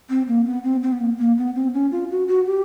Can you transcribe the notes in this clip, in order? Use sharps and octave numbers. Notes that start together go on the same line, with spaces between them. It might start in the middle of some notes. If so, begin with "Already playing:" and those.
C4
A#3
B3
C4
C4
B3
A#3
A#3
B3
C4
C#4
F4
F#4
F#4
G4